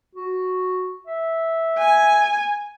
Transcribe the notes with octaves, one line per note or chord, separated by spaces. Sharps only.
F#4
E5
G#5